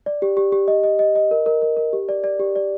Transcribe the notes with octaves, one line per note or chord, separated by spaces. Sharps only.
D5
G4
G4
G4
D#5
D#5
D#5
D#5
A#4
A#4
A#4
A#4
G4
D5
D5
G4
D5